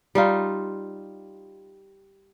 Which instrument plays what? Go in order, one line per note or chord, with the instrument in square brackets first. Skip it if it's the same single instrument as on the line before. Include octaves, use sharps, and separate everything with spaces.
[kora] G3 D#4 F4